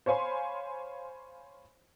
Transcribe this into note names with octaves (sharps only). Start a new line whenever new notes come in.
C5 C#5 F5 G#5 B5 C6